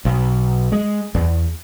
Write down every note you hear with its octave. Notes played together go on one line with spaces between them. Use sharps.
B1
G#3
E2